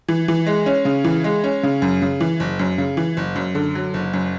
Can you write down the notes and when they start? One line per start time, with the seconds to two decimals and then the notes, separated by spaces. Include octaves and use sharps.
0.08 E3
0.28 E3
0.47 G#3
0.66 C#4
0.85 C#3
1.04 E3
1.24 G#3
1.44 C#4
1.63 C#3
1.82 F#2
2.02 C#3
2.20 E3
2.40 F#1
2.59 F#2
2.78 C#3
2.97 E3
3.17 F#1
3.36 F#2
3.55 D3
3.75 F#3
3.94 F#1
4.13 F#2